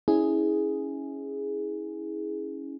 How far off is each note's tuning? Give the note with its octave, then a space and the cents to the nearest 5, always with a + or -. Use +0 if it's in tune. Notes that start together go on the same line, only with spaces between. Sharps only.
C#4 +0 E4 -30 G#4 +0